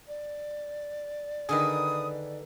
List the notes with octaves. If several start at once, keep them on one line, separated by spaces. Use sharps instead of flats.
D5
D3 D#3 G#4 A#4 B4 D#6